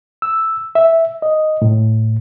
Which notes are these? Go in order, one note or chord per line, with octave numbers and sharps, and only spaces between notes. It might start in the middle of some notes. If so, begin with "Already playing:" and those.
E6
E5
D#5
A2